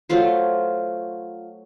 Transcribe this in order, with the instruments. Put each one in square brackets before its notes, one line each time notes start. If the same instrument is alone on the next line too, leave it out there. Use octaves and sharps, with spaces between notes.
[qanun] F#3 A3 F4 C5